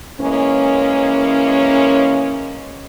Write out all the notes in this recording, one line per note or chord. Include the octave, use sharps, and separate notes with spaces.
E3 G#3 A#3 C#4